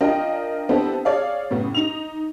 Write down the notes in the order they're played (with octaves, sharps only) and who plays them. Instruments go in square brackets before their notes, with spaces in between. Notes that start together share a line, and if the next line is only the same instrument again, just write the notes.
[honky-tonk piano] D4 F4 A#4 D#5 G5
B3 C4 D4 E4 G4 A4
G#4 C#5 D5 F5
F#2 A2 C#3 B3
D#4 F7